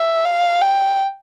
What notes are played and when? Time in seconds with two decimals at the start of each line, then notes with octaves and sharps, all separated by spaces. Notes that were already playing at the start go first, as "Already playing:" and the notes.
Already playing: E5
0.25 F5
0.61 G5